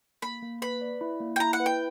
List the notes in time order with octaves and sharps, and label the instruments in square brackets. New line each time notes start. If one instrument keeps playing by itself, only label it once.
[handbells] A#3 [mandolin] B5
[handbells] A#3
[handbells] B4 [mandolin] B5
[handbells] D5
E4
A#3
[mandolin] G5
[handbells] E4 [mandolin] A#5
[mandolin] F#5
[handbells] B4
[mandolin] G5